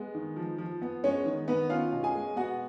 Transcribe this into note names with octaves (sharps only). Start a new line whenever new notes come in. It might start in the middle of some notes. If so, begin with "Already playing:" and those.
Already playing: G#3 B3
D#3
F3
F3
B3
G#3 C#4 C#5
D#3
D#3 B3 B4
C#4 F4 F5
B2
G#4 G#5
G#3
B3 F#4 F#5